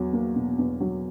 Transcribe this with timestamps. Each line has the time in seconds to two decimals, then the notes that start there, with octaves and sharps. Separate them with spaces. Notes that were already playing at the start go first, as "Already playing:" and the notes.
Already playing: E2 F#3
0.13 A#3
0.36 B2
0.59 E2
0.80 F#3